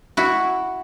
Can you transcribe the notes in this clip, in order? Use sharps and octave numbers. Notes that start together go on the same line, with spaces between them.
E4 F#4